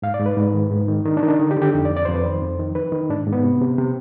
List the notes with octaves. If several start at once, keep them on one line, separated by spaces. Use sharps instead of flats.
G#2 F5
D5
G#2
B4
G#2
D#3
G#2
D#3
D#3 D4
D4
D#3
D4
D3 D#4
G4
D3
G4
F2 D#4
D5
F2
D5
F2 C5
B4
D#3 C5
F2
D#3
D#3 B4
D#3
G#2 D4
G#2
B3
C3
C3
C3